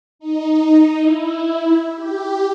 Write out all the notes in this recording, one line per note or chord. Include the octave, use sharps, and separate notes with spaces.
D#4
E4
G4